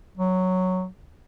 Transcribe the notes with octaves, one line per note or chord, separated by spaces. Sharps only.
F#3